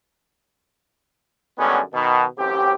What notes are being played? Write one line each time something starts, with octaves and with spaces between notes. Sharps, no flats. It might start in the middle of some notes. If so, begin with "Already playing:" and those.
F#2 D3 G3 G#3 B3 C#4
B2 D#3
A1 F#2 C4 G4